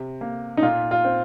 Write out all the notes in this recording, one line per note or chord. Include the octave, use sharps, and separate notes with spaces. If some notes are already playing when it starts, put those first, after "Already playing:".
Already playing: C3
A#3
D#4
A#2 F4
F4
C4